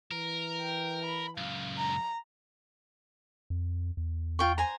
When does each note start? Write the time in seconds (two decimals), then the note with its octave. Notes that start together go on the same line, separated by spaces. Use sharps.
0.11 E3 A#4
0.60 G5
1.06 B5
1.38 C#2 F#2 F5
1.78 A#5
3.50 F2
3.97 E2
4.39 F4 G5 C#6
4.58 C5 G#5 A#5